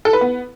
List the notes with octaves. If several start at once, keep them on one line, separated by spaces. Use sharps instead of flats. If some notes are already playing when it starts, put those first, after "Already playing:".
A4
B4
B3